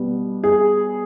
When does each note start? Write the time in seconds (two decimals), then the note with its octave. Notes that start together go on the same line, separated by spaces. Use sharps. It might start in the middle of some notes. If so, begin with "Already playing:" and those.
Already playing: B2 G3 B3
0.44 G#4